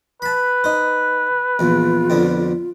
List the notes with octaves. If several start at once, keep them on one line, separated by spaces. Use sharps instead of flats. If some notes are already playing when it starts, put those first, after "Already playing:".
B4 A5 B5
D#4 C5
A#1 E2 F4
F2 D3 B3